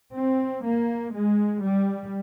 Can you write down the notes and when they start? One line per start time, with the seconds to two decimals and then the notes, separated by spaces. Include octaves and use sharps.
0.13 C4
0.63 A#3
1.13 G#3
1.64 G3